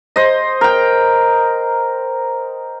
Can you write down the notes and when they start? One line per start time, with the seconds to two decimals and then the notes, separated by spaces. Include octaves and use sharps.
0.16 C5 D#5
0.61 A#4 G5